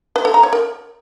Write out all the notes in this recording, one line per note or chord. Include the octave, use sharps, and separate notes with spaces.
B4
A4
A#5
C#5
A#4